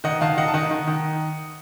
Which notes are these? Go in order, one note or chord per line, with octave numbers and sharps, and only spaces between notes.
D#3 D#5 F#5
D#3 F5 A5
D#3 D#5 F#5
A5
D#3 D#5 F#5
D#3
D#3